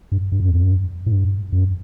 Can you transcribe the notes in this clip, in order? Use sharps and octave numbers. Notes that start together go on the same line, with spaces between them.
G2
G2
F#2
E2
F#2
A2
G2
F#2